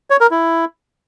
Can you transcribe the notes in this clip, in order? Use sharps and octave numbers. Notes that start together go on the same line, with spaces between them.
C#5
A#4
E4